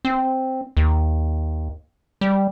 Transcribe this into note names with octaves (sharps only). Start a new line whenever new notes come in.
C4
D#2
G3